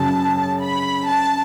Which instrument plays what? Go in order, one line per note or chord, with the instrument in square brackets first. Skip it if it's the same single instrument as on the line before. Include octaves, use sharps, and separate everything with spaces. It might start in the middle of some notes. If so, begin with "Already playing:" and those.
Already playing: [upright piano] F#2 C#3 F#3 [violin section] A5
[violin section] B5
A5